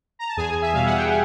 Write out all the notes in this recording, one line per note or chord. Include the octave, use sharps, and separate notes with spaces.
A#5
A5
E2 G#4 G#5
E5
B2 G3 F5
F#5
G5
G#5